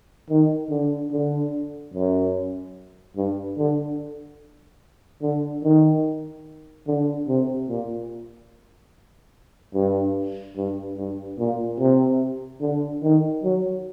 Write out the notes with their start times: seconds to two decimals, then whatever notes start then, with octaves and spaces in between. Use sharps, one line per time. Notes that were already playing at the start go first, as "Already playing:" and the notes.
0.30 D#3
0.71 D3
1.12 D3
1.94 F#2
3.17 G2
3.58 D3
5.22 D3
5.64 D#3
6.88 D3
7.28 C3
7.69 A#2
9.75 G2
10.57 G2
10.97 G2
11.39 A#2
11.80 C3
12.61 D3
13.03 D#3
13.44 F#3